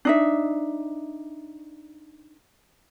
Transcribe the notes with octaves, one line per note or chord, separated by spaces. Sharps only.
D4 D#4 E5